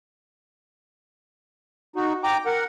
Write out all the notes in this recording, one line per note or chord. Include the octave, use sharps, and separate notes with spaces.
D#4 F#4
G5 A#5 D6
A#4 F#5